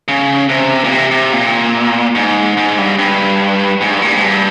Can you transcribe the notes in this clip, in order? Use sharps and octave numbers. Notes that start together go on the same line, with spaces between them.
C#3
C3
A#2
C3
C3
A#2
G#2
G#2
G2
G2
G#2
G2
A#2
G#2
G2